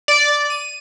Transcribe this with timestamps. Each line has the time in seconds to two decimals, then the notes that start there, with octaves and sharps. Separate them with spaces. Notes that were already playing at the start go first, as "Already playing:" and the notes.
0.08 D5
0.50 D#7